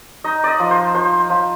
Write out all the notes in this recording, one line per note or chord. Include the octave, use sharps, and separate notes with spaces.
D#4 D#5
D5 D#5
F3
C5
F3 C5
F3